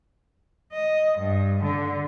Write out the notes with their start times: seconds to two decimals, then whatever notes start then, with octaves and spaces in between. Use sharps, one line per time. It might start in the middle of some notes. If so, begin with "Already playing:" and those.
0.73 D#5
1.19 G2
1.64 D3